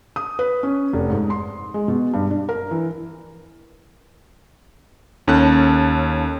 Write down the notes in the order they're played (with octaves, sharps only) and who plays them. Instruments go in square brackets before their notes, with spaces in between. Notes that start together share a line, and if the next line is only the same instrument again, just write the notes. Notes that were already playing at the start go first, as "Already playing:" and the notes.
[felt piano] D#6
B4
C#4
F1
G#2
C6
G#3
B2
G2
D4
A#4
E3
[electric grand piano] D#2 C#4 A4 A5 F#6